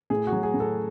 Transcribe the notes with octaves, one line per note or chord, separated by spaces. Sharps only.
A2 G#4
F#4
F#3
G#4
A2
A4